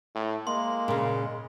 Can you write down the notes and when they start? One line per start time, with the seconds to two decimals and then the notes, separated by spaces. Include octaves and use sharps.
0.15 A2
0.47 G#3 A#3 C6
0.88 A#2 C#3